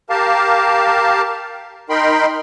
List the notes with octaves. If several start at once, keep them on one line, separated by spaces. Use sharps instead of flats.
G4 A#4 F5 A5
D#4 A#4 G5 B5 C6